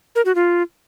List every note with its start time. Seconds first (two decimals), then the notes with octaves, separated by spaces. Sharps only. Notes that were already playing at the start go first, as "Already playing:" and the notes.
0.16 A#4
0.25 F#4
0.35 F4